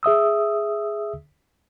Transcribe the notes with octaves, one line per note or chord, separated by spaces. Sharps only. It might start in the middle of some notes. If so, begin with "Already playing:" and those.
G#4 E5 D#6 E6